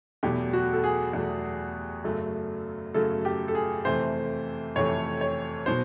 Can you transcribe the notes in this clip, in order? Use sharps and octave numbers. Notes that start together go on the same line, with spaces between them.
E2 B2 F#3 A3 G4
F#4
A4
G#4
E2 B2 F#3 A3
F#2 C#3 F#3 A3
F#2 C#3 F#3 A3 A4
G4
A4
G#4
F2 C3 E3 A3 C5
F2 C3 E3 A3 C#5
C#5
B2 F#3 C5